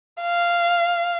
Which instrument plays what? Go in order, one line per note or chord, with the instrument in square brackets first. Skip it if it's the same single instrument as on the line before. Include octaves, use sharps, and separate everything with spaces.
[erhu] F5